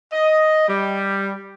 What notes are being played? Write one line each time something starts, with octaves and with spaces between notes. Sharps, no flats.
D#5
G3